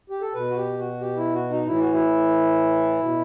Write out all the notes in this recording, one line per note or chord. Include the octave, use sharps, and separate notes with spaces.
G4
A4
B2 B4
F#4
G4
F#4
G4
E4
F#4
D#4
A2 E3 E4
F#4
E4
B2